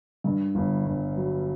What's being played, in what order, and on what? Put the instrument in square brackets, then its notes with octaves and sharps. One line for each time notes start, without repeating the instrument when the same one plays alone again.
[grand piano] G2
G1
G1
F#3